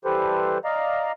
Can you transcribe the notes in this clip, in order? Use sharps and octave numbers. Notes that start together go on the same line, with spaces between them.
E3 G3 G4 A4 B4 C5
D5 D#5 F5 A#5